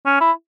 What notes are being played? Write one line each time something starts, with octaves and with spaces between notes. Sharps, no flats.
C#4
E4